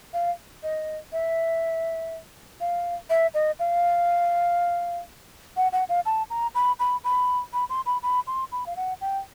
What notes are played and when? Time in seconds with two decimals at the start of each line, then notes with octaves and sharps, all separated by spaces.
0.13 F5
0.63 D#5
1.12 E5
2.60 F5
3.10 E5
3.34 D#5
3.59 F5
5.57 F#5
5.73 F#5
5.89 F5
6.06 A5
6.30 A#5
6.55 B5
6.79 B5
7.04 B5
7.53 B5
7.70 C6
7.86 B5
8.03 B5
8.27 C6
8.52 B5
8.66 F5
8.76 F#5
9.01 G5